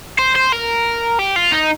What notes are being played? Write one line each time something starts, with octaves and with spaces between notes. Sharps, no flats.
C5
C5
A#4
G4
F4
D#4